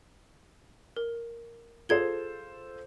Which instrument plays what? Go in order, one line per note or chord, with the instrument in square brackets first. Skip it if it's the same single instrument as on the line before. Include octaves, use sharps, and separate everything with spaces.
[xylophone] A#4
[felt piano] F4 A4 C5 [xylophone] G#4 G#6 G7